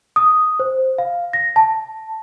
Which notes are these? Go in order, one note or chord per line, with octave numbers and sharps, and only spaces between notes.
D#6
C5
F5
A#6
A5